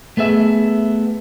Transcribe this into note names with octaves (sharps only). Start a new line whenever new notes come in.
A3 B3 G#4 E5